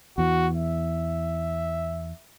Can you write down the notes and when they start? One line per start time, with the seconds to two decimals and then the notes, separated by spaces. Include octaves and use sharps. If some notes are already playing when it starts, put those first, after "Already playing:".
0.18 E2 E3 F#4
0.56 E5